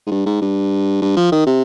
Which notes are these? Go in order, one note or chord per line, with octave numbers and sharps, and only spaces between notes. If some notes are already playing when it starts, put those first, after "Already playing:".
G#2
G2
G#2
G2
G2
F3
D#3
C3